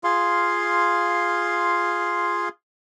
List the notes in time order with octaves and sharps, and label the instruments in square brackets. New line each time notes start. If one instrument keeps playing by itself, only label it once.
[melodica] F4 G#4 F5 C6